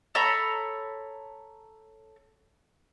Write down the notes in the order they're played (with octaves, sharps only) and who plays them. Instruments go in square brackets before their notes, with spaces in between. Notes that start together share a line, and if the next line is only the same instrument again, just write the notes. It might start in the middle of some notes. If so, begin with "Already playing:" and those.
[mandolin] A4 C#5 A#5 B5